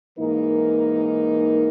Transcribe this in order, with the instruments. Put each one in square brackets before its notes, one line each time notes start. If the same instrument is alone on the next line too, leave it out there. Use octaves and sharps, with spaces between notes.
[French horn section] G#2 E3 A#3 D#4 A#4